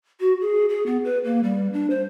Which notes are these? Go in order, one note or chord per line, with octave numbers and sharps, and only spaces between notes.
F#4
G#4
G#4
B3
B4
A#3
G3
D4
C5